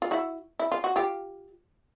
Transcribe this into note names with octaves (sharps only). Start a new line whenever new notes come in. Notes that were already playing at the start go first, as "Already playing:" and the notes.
F4
E4 F#4
E4
F4
F#4
F4 G4